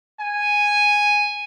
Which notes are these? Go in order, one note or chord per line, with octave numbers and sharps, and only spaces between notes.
G#5